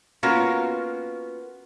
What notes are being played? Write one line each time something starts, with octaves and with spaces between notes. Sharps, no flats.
A#3 B3 C#4 F4 F#4 A#4